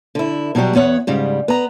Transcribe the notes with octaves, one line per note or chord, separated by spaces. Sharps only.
D3 E4
B2 F#3 G3 F#4 G4
E2 B3 C#5 F#5
G#2 C#3 G3
B3 A#5